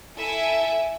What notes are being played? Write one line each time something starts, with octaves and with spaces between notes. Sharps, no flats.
E4 A4 E5 G#5